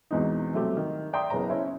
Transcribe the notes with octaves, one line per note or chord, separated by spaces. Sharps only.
E2 G#2 B2 E3 C4 D#4
C3 F#3 G3 A3 C4 G4
D#3
D5 E5 G5 A#5 C6 D#6
F#1 C#3 B3 C#5 A#5
C#4 E4 C5 C#5